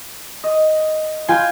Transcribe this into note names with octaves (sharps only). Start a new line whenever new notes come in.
D#5
F4 B4 G5 G#5